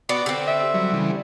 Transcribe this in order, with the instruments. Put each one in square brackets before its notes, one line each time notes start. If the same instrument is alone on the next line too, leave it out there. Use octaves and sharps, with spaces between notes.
[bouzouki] B3 [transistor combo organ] F#4 C#6 [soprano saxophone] D5
[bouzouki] D3 C4 [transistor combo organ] G4
[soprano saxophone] E5
[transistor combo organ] F#3 G3
C#3 E3 G3